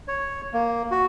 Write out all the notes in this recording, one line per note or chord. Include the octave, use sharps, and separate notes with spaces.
C#5
A#3
F#4